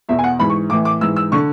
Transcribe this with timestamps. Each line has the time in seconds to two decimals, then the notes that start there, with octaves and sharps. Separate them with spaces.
0.09 E2 B2 E5
0.19 G#5
0.24 F#5
0.39 G#2 E3 B5
0.50 C#6
0.70 A2 E3 D6
0.85 D6
1.01 G#2 E3 E6
1.16 E6
1.32 D3 C#6